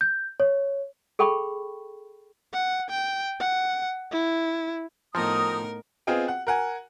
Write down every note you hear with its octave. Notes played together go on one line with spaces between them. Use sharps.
G6
C#5
G#4 A4 G5 B5 C#6
F#5
G5
F#5
E4
A2 F3 B3 D#4 A#4 G5 A#5 D#6
B3 C4 F4 G#4 D#5 G5
F#5
A#4 F#5 G#5